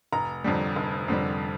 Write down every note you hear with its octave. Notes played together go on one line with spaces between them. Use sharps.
F1 A#5
F2 D3 G3
F1
F2 D3 G3